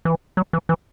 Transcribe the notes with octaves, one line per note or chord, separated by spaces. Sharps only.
E3
F#3
E3
E3